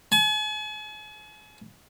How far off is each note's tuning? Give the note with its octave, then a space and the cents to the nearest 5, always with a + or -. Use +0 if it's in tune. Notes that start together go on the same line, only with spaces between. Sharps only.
G#5 +45